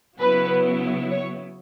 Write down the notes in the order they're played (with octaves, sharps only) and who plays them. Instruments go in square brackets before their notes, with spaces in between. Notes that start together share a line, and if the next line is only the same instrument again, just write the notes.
[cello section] C#3 F#3 B3 E4 [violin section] B4
[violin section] C#5